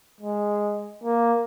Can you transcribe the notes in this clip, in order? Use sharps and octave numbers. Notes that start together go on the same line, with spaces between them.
G#3
A#3